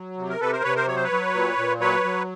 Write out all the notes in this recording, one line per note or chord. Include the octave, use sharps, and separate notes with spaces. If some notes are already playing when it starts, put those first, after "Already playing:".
Already playing: F#3
C3
A#4
C3 A4 B4
A#4 C5
C3 B4 C#5
A#4 C5
F#3 C#5
C5
B4 C#5
F#3
A#2
A#2
F#3 B4 C#5
F#3